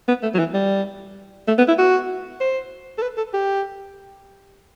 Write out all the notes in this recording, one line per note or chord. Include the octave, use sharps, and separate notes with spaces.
B3
A3
F#3
E3
G3
A3
B3
E4
F#4
C5
A4
B4
A4
G4